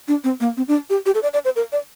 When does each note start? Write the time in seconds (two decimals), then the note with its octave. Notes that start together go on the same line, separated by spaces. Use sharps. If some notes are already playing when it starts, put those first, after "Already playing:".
0.08 D4
0.24 C4
0.40 A#3
0.57 C4
0.68 D4
0.90 G4
1.06 G4
1.15 A4
1.23 D5
1.33 D5
1.45 C5
1.56 A#4
1.72 D5